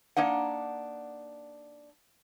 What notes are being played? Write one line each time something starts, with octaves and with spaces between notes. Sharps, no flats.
A#3 D4 D#4 F#5